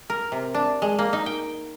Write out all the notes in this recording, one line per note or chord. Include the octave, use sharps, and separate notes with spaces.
A#4
C3
D4
G#3
A#3
D#4
G5